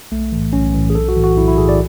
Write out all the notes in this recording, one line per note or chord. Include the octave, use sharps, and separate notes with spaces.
B1 A3
A2 E3
B1 C#4
A2 E3
G#4
B1 A4
F#4
A2 E3
F#4
B1 E4
E4
A2 E3 G#4
D5